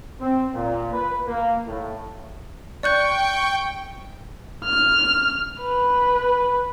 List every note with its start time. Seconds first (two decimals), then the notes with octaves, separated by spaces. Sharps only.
0.20 C4
0.54 A#2
0.93 B4
1.27 A#3
1.67 A2
2.83 D5 G5 C#6 F#6 G6
4.65 F6
5.60 B4